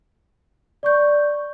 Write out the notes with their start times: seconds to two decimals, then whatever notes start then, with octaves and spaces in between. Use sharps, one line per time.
0.83 D5 C#6 G6